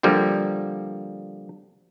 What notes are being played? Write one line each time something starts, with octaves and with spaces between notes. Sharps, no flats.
D3 F3 G3 A#3